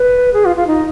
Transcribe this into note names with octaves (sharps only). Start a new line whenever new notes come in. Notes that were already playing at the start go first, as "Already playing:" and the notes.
Already playing: B4
G#4
F4
F4
D#4